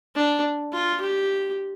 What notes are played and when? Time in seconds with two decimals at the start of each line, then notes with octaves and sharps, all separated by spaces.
0.15 D4
0.73 F4
1.01 G4